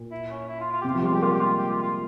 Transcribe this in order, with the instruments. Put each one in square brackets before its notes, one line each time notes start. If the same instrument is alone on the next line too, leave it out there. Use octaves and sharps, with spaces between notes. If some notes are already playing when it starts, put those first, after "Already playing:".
Already playing: [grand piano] A#2
[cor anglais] E4
C#4
E4
F4
F4
[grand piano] C3 [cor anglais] G4
[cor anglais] F4
[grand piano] F3
[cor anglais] G4
[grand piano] G3 [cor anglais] F4
[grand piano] G#3 [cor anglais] G4
[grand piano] A#3 [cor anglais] F4
[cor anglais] G4
F4
G4
F4
F4